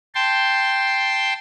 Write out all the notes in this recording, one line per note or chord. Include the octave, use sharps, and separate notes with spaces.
G5 A5 C6